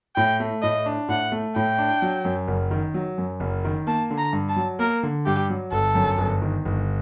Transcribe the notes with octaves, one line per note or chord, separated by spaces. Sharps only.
A2 G5
A3
A2 D#5
D4
A2 F#5
A3
A2 G5
D4
F#3
F#2
F#1
D#3
F#3
F#2
F#1
D#3
A#3 A5
D3
A#5
G2
A5
F#3
A#3 A#4
D3
G2 G4
F#3
G1 A4
F#2
G1
D#3
G1